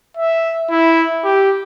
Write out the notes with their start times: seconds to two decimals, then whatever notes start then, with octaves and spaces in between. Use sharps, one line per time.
0.17 E5
0.71 E4
1.24 G4